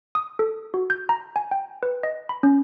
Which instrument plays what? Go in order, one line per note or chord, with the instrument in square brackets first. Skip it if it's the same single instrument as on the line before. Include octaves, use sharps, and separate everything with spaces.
[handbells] D#6
A4
F#4
G6
A#5
G#5
G5
B4
D#5
B5
C#4